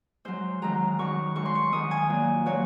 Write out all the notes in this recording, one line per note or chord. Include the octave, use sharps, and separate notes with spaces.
G#2 F#3 C5
G#2 D#3 F#3 A#5
F#2 D#3 F#3 C#6
G#2 F#3 C#6
C6
C#6
G#2 D#3 F#3 D#6
G#5
A#2 F#3
A#2 F#3 C#5